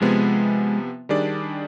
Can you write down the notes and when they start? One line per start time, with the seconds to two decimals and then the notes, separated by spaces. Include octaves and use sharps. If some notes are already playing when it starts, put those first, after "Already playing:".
0.01 C3 F3 G#3 B3
1.09 D#3 G3 D4 G#4 D5